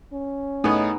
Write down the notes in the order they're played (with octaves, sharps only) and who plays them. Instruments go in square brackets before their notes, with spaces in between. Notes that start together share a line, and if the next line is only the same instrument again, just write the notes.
[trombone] C#4
[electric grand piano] A2 A3 C#5 [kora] B3 G#4 [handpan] D#4